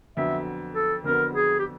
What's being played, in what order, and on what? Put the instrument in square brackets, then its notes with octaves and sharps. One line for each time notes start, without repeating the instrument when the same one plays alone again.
[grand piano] F2 D3 F#3 B3 [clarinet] E5
[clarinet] A4
[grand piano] F2 D3 F#3 B3 [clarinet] A#4
[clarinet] G#4
G4